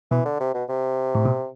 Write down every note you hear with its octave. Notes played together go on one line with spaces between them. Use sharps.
B2 E3
D3
C3
B2
C3
A2
B2